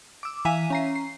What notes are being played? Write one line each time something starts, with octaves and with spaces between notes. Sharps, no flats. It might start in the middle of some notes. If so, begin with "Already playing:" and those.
D6 E6
E3 E5 F5 G#5 B6 D#7
C#4 A#5 C7
C7